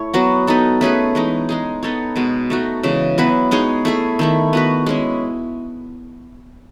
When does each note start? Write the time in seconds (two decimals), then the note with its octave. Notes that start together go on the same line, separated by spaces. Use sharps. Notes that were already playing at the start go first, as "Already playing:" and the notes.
Already playing: A3 E4 C#5
0.14 F#3 B3 F#4
0.47 B3 D#4 A4
0.81 A3 C#4 G#4 B4
1.15 E3 G#3 D#4
1.49 G#3 D#4 G#4
1.83 B3 D#4 A4 C#5
2.16 B2 G#3 B3
2.50 A3 D#4 F#4
2.83 C#3 E3 G#3
3.18 F#3 B3 E4 B4
3.51 G#3 D#4 G#4 C#5
3.85 A3 E4 G#4
4.19 D#3 A3 E4
4.53 B3 F#4 B4
4.86 G#3 C#4 E4